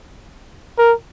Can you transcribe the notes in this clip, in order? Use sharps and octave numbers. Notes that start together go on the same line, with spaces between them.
A#4